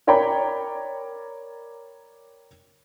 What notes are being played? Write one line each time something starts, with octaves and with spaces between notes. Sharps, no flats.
A#4 C#5 D5 G5 A#5 B5